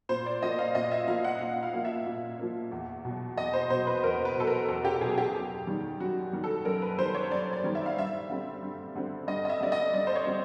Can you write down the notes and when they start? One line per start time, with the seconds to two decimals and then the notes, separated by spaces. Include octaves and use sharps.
0.09 A#2 C5
0.26 D5
0.42 F3 A#3 D#5
0.59 F5
0.75 A#2 D#5
0.91 E5
1.08 F3 A#3 F5
1.24 F#5
1.41 A#2 F5
1.63 F5
1.74 F3 A#3
1.85 E5
2.06 A#2
2.39 F3 A#3
2.72 E2
3.05 B2 F#3
3.37 E2 D#5
3.53 C5
3.70 B2 F#3 C5
3.87 B4
4.03 E2 A#4
4.25 B4
4.36 B2 F#3 A4
4.47 A#4
4.69 E2 A4
4.85 G4
5.01 B2 F#3 G#4
5.18 G4
5.34 F#2
5.67 D#3 G3
6.00 F#2 F#4
6.33 D#3 G3
6.44 A4
6.65 F#2 A#4
6.82 B4
6.98 D#3 G3 C5
7.14 C#5
7.31 F#2 D5
7.53 D5
7.64 D#3 G3
7.75 E5
7.86 F5
7.97 G2 E5
8.29 D3 G3 C4
8.63 G2
8.95 D3 G3 C4
9.27 G2 D#5
9.45 D#5
9.49 E5
9.61 D3 G3 C4 D5
9.72 D#5
9.93 G2 D5
10.07 C5
10.15 C#5
10.26 D3 G3 C4